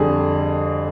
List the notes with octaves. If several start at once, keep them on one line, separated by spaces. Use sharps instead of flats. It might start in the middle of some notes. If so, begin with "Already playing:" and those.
Already playing: F2 D3 G3 G#4